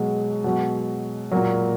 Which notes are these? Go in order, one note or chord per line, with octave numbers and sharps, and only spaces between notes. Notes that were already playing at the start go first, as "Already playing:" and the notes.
Already playing: B2 F#3 G#3
B2 F#3
A#2 F#3 A#3